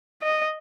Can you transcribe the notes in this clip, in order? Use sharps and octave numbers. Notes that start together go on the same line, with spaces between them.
D#5